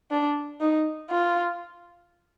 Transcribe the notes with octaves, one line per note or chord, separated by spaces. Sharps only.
D4
D#4
F4